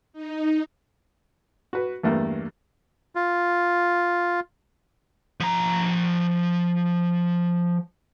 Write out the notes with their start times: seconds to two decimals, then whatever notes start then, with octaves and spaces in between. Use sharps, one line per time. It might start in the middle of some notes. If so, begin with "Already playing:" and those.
0.13 D#4
1.73 F#4 B4
2.03 E2 G2 A3 A#3
3.15 F4
5.40 F3 A#5